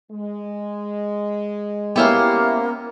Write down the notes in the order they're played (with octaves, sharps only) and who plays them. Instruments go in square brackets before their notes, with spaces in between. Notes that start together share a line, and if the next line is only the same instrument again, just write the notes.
[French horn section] G#3
[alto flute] A#3 [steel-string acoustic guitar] B3 C5 F5 [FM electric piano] C#4 E4 G4